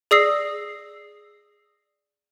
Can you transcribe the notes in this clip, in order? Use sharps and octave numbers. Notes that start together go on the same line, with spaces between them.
G#4 D5 D#6 E6 A#6 C7